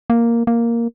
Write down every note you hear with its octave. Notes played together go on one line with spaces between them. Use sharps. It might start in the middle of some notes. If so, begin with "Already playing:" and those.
A#3
A#3